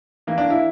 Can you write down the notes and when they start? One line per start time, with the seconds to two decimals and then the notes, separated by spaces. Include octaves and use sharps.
0.27 E3 A#3
0.38 D4
0.50 E4